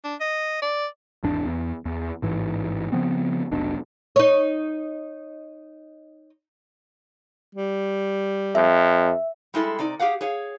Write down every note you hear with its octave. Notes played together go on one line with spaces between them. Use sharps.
D4
D#5
D5
G#1 E2 D4
E2
E2
A1 G#2 E3
C#3 F3 B3 C4
F1 B1 B2 D4
D#4 C#5
G3
F2 E5
G3 G#3 E4 A4
C3 D#4 D5
G4 G#4 F5 F#5
G#4 C#5 F5